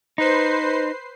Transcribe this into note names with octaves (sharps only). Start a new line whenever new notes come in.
D#4 B4 C5 C7